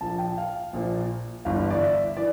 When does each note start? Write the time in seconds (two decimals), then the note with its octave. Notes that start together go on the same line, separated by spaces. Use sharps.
0.01 A#1 A#2 F3 A5
0.19 G5
0.38 F5
0.73 A#1 A#2 F3
1.45 G1 G2 E3 F5
1.70 D5
1.81 E5
2.17 E3 D5